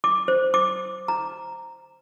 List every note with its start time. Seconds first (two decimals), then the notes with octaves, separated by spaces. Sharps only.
0.04 D6
0.28 C5
0.54 D6
1.08 A#5